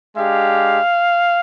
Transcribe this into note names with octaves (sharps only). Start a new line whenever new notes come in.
G#3 D4 G4 F5